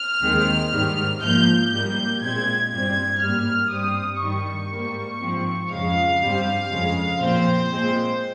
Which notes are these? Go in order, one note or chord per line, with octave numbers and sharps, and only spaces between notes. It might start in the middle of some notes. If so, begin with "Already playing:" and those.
Already playing: F6
D#2 D#3 G#3 C4
G#2 D#3 G3
G#2 F3 A#3 G6
G#2 G3 A#3 G6
A#2 G#3 C4 G#6
G2 G3 C4 G#6
G#2 G3 A#3 F6
G2 G3 C4 D#6
G2 D#3 G3 C#6
G#2 G3 A#3
G#2 F3 C4
F2 C#3 G#3 F5
G2 G3 C4
F2 C#3 G#3
A#2 F3 C4 C5
A#2 G#3 C4